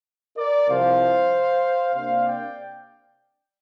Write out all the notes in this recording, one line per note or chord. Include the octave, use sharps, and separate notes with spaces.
A#4 D5
C2 C3 F3 C5 F5
C3 A#3 D4 C5 F5
D5 G5